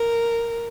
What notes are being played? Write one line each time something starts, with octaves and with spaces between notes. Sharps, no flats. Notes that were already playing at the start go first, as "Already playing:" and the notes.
Already playing: A#4